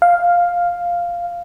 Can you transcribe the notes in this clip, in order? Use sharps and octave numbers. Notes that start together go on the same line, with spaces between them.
F5